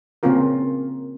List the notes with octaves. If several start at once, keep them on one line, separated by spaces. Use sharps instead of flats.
C#3 A#3 C4 C#4 F4 A#4